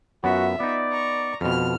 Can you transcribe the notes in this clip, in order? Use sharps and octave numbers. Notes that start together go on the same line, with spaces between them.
F#2 B3 F4 F#4 E5
B3 D#4 D5
A#5 C#6
F2 B2 F6